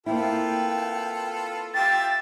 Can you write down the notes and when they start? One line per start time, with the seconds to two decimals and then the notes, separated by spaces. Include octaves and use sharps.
0.06 A#3 C4 E4 F4 A4 B4 G5
1.74 F4 G4 E5 G5 A6